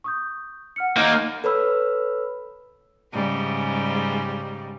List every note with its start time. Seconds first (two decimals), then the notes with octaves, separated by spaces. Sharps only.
0.04 C#6 D#6 G6
0.76 F#5 F6 C#7
0.97 A#3 D#4
1.44 A4 B4 C#5 B5 E6
3.13 G#2 C#3 G3